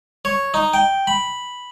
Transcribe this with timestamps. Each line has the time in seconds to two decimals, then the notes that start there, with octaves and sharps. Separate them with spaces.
0.25 C#5
0.54 D#4
0.73 G5
1.07 B5